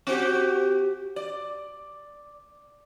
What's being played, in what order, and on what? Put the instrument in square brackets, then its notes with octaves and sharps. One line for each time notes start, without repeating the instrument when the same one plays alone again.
[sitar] C4 F#4 G4
D5